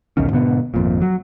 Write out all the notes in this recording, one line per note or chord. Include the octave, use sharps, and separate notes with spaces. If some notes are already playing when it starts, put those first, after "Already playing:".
B1 E2 D#3 C#4
G#2 B2 D3 B3
G#1 F2 A#2
F#3